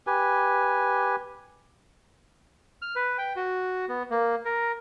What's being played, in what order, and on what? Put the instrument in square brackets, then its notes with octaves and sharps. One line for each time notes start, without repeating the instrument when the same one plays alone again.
[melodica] G4 B4 G#5
[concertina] F6
B4
G5
F#4
B3
A#3
A#4